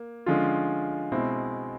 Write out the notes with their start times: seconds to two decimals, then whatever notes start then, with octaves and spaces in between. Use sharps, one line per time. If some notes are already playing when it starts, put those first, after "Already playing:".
Already playing: A#3
0.26 D3 F3 G#3 C#4 F4
1.12 B2 G#3 C4 E4